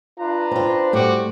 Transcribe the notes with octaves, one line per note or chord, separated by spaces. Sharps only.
D4 F4 B4 A#5
C4 F4 C5
A2 G3 C4 F#4 D6